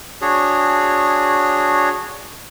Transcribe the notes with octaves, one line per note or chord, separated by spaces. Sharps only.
D4 F#4 G#4 C#5